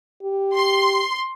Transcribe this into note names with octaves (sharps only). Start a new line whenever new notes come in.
G4
C6